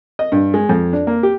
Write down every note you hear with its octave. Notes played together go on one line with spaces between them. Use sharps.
D#5
G2
G#3
F2
D4
A#3
G4